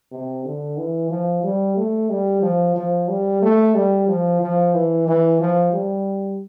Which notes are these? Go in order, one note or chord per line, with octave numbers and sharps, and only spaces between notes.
C3
D3
E3
F3
G3
A3
G3
F3
F3
G3
A3
G3
F3
F3
E3
E3
F3
G3